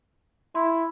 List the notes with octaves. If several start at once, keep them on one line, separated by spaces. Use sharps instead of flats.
E4 C6